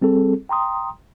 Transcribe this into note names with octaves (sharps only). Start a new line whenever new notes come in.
G3 C4 G#4 A4
G5 A#5 C6 D#6